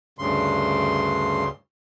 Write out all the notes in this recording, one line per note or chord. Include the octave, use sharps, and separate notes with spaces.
D2 G2 C#3 C6